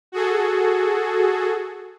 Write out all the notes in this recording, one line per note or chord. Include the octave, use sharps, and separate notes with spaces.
F#4 G#4 A4